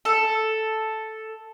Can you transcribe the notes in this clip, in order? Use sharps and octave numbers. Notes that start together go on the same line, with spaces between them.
A4